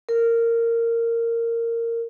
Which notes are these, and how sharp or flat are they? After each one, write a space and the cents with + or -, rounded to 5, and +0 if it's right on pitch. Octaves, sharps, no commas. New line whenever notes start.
A#4 -15